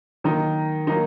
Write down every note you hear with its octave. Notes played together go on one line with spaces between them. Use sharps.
D#3 F#3 A#3 D#4
F#3 A#3 D#4